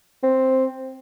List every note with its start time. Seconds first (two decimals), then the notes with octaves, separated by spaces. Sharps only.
0.23 C4